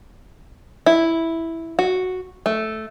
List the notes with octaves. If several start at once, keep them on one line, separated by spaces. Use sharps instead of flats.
E4
F#4
A3